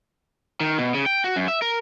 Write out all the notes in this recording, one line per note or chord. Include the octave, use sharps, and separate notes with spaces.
D#3
B2
C#3
G5
F#4
F#2
E5
A#4